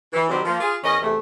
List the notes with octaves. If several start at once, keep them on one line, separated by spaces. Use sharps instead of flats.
E3
C3 D#3 F#3 G3 C4
F3 A#3
F4 G#4
E2 C#4 A#4 D#5
E2 C3 A3